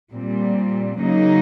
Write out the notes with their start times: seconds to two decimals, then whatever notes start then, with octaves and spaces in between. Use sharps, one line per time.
0.13 A#2 G3 C4
0.99 C#3 F#3 A#3 D#4